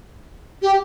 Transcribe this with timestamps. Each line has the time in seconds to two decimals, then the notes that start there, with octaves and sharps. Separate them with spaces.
0.62 G4